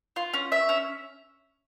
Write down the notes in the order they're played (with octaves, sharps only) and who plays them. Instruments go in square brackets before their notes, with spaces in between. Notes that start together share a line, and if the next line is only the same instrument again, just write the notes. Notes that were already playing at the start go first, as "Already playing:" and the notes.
[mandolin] F4
C#4
E5
C#4